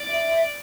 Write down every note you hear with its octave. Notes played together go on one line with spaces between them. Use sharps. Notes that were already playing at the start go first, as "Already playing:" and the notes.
Already playing: D5
E5